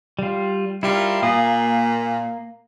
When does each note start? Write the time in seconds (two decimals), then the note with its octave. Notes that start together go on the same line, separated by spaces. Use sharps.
0.19 G3 F4
0.83 G3 E4 F4 A#4
1.23 A#2 A#3 F5 D#6